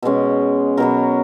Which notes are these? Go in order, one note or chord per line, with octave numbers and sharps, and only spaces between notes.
B2 G#3 C#4
B2 F#3 B3 A#4